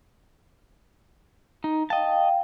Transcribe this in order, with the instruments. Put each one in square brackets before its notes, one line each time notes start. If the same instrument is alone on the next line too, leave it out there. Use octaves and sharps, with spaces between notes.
[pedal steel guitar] D#4
[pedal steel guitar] D#5 A5 [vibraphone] F5 G5